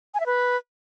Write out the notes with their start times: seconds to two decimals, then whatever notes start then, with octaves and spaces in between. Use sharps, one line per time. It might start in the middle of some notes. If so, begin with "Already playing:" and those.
0.14 G#5
0.20 E5
0.26 B4